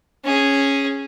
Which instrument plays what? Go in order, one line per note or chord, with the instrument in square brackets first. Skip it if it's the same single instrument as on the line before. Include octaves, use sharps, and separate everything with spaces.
[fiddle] C#4 G#4